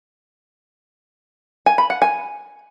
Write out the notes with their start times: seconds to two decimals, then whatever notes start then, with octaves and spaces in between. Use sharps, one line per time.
1.66 G#5
1.78 B5
1.90 F#5
2.02 G#5